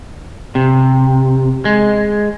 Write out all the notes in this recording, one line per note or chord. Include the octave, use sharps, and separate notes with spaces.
C3
G#3